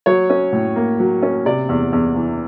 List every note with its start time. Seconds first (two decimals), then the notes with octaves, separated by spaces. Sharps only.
0.06 F#3 C#5
0.30 C#4
0.52 A2
0.76 A#3
0.99 F#3
1.23 C#4
1.46 C3 D5
1.69 E2
1.92 E2
2.16 E3